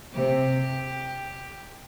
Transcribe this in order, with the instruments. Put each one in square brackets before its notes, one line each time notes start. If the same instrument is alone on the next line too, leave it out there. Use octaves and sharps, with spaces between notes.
[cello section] C3 [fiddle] G4